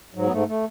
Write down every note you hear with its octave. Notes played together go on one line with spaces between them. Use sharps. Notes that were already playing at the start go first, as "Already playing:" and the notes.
G#2 F#3
B3
G#2 A3
A3